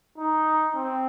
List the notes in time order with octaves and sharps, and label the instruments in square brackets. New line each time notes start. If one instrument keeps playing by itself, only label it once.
[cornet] D#4
C4